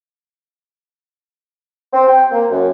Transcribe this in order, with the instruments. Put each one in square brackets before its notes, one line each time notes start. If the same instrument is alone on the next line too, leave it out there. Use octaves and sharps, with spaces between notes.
[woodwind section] C4
G5
A#3
F#2